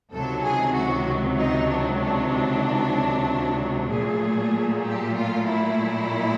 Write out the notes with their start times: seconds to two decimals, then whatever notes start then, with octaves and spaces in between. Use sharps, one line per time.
0.13 C#2 C3 D#3 F#3 A4
0.44 G#4
0.75 F#4
1.39 D#4
1.69 D4
2.02 D4
3.89 A#2 F#3 A3 G#4
4.83 G4
5.16 F4
5.47 E4